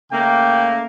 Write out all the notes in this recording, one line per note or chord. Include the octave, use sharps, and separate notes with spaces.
C#3 A3 A#3 G5